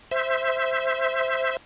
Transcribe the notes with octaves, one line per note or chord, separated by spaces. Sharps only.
C5 E5